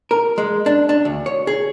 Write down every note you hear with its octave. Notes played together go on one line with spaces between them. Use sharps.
A#4
G#3
D4
D4
D2
C#5
G#4